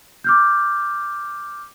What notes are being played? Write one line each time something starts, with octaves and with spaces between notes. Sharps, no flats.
D6 F6 G6